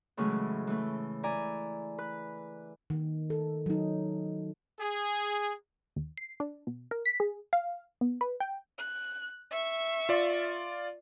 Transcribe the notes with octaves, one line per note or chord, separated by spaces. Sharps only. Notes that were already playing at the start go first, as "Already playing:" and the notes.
A2 C#3 E3 F#3 G#3 A3
E3 A3
E4 D5 G#5 A#5
B4
D#3
A4
F#3 D#4
G#4
D#2
C7
D4
B2
A#4
B6
G#4
F5
B3
B4
G5
F#6
E5 C#6
F4 D5